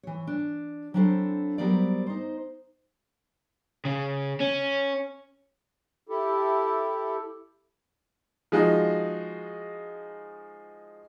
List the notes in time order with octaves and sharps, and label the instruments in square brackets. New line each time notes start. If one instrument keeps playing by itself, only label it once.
[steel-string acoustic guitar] E3 C#5
D4
F#3 C4 D4 E4 A4 C5
F#3 G3 B3 A#4 C5 D5
D#4 C5
[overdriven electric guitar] C#3
C#4
[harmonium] E4 G4 A4
[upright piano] F3 G#3 D#4 F#4